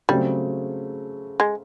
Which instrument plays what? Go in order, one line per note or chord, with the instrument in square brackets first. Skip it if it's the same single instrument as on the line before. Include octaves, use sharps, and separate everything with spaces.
[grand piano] C#3 F#3 A3 C4 [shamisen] G3
[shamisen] G#3